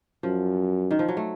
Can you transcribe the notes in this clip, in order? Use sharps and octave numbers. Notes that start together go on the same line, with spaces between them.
F#2 F3
D#3
F3
F#3
A3